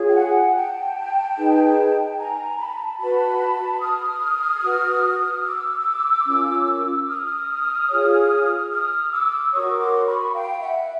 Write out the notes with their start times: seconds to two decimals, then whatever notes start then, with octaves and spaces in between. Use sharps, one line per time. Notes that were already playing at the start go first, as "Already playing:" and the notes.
Already playing: F4 G#4 C#5
0.09 G5
0.14 F#5 G#5
0.55 G5 A5
1.37 D#4 G#4 B4
2.18 G#5 A#5
2.59 A5 B5
3.00 F#4 B4 A5 B5
3.81 D#6 F6
4.63 F#4 B4
5.44 D6 E6
6.26 C#4 F4 A#4
7.08 D#6 F6
7.89 F4 G#4 C#5
8.71 D#6 F6
9.12 D6 E6
9.52 F#4 A#4 C#5 C#6 D#6
9.79 C6 D6
10.06 B5 C#6
10.34 F5 G5
10.61 E5 F#5